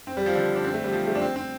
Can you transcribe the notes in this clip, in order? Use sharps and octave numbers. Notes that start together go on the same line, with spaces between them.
C4
G3
F3
D3
D4
C4
A3
G3
F3
A3
D4
C4
C4